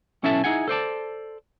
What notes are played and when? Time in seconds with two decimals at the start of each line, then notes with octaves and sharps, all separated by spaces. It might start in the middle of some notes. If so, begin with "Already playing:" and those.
0.23 B1 C#4 E4 A4 E5 A5
0.44 D#4 E4 G#4 F#5 G#5
0.68 A4 C5 D5 A5